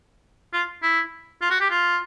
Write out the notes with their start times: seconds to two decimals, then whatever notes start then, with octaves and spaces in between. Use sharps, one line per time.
0.53 F4
0.82 E4
1.41 F4
1.50 F#4
1.60 G4
1.70 F4